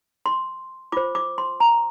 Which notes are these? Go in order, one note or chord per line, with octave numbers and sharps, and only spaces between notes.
C6
F4 C5 D6
D6
C6
A#5